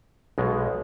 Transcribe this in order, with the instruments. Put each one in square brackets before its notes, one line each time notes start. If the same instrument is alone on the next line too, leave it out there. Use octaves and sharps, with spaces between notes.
[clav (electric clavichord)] B1 B2 G#3